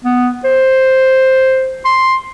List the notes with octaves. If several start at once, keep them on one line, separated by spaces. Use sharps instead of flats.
B3
C5
C6